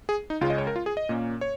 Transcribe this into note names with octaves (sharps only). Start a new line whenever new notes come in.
G#4
D#4
C#2 C#3 G#3 C#4 F4
D#5
C#5
A#4
F4
G#4
D#5
A#2 A#3 C#4
C#5